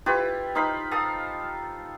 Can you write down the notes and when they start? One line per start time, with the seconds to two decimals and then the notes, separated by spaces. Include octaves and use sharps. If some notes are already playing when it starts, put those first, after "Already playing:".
0.06 E4 F4 G4 B4
0.55 D#4 C5 F5 B5
0.91 A4 F5 A5 D#6